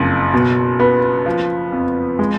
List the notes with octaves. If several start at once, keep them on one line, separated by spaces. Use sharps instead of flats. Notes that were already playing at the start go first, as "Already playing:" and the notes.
Already playing: F#1 F2
B2
B3
F3
F2
G#3